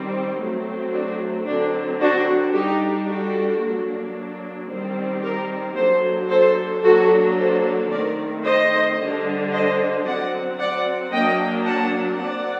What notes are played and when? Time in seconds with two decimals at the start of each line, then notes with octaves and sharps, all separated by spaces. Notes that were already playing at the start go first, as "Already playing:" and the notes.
Already playing: D#3 G3 C4
0.40 F#3 A3 C4
0.93 D4 F#4
1.47 D3 F#3 C4 D4
2.01 D4 F#4
2.54 G3 D4 D#4 G4
3.08 F#4 A4
3.62 F#3 A#3 D4
4.69 D#3 G3 C4
5.22 G4 A#4
5.76 F#3 A#3 D4 A4 C5
6.29 A4 C5
6.83 F#3 A#3 D4 F#4 A4
7.37 A4 C5
7.91 D#3 A3 C4 A#4 D5
8.44 C5 D#5
8.99 D3 G3 D4
9.52 C5 D#5
10.06 F#3 C4 D5 F#5
10.59 D5 F#5
11.13 F#3 A#3 D4 D#5 G5
11.66 F#5 A5
12.20 F#3 C4 D5 F#5